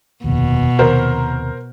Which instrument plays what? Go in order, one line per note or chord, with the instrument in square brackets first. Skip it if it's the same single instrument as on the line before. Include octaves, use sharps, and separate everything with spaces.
[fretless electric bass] F1 D#2 [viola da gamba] B2
[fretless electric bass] D#2 C3 D#3 [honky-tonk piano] A#4 C5